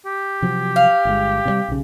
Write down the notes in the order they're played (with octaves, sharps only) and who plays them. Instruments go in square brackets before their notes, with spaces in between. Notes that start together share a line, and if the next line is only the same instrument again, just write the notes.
[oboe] G4
[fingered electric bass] C3 F3 F#3
[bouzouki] F5
[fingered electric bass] G1 G#3
C3 F3 G3
B1 C#3